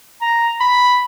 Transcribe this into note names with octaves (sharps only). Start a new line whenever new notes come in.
A#5
B5